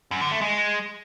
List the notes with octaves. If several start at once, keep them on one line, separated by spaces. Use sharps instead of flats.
F#2
D3
A3
G#3